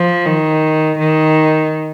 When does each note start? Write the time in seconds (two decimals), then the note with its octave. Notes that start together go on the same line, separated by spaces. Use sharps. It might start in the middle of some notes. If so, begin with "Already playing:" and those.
Already playing: F3
0.25 D#3
0.98 D#3